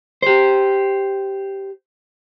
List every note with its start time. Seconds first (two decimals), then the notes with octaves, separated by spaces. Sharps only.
0.22 G4 C5